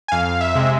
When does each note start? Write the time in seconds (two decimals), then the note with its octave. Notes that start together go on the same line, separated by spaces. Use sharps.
0.08 G#5
0.12 F2 F5
0.41 E5
0.55 C3 G#3